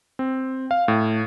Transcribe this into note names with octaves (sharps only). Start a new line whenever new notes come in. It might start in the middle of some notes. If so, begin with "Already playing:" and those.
C4
F5
A2